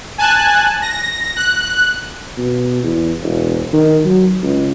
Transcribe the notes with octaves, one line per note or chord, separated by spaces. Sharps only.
G#5 A5 F#6
A#6
F#6
B2
E2
E1
D#3
F#3
C#2